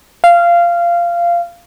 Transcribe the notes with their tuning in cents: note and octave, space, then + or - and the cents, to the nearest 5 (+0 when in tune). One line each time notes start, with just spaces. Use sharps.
F5 -15